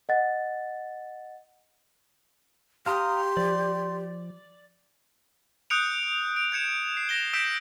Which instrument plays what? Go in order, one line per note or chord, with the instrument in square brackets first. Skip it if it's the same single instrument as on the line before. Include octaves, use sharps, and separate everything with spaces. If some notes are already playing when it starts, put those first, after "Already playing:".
[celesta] D#5 F#5 A6
[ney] G4 [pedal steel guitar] F5 A#5 D#6 [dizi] C6
[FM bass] F3 [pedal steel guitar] D5
[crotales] D#6 F#6 G6 C#7 D7 F7
D7
G6 G#6 C#7 E7
C7
A#6 E7 G7
E6 G6 B6 D7 E7